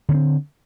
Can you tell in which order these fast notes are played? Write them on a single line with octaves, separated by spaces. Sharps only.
D3 C#4 C4